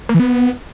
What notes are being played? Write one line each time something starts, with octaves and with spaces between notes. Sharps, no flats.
A#3
E3
B3